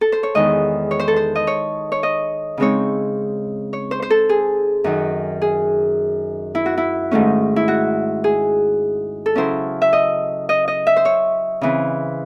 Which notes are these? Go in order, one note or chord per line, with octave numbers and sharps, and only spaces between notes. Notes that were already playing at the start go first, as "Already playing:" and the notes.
A4
C5
C#5
E2 D#3 G#3 D#5
C#5
C5
A4
C5
D#5
C#5
C#5
D#5
C#3 G#3 C4 D#4 C#5
C#5
C5
C5
A4
G#4
F#2 D#3 F#3
G#4
E4
F#4
E4
G#2 D#3 A3 C#4
E4
F#4
G#4
A4
C#3 F#3 C#4 E4 C5
E5
D#5
D#5
D#5
E5
C5
C#5
C#3 E3 C4